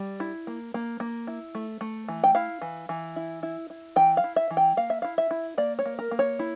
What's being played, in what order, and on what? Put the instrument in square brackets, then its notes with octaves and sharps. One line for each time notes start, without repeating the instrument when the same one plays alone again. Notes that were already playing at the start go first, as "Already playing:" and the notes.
Already playing: [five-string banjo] G3
E4
A#3
A#3
A#3
E4
A3
A3
E3
G5
E4 F5
E3
E3
E4
E4
E4
E3 G5
F5
E4
E5
E3
G5
A#3 F5
E5
E4 F5
E5
E4
A#3 D5
C#5
A#3
A#4
A#3
C#5
E4